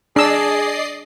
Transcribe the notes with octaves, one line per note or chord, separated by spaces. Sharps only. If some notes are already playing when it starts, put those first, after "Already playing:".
D4 G#4 D5 D#5 E6 C7